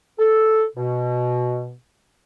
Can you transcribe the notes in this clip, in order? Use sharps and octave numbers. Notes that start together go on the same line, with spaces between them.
A4
B2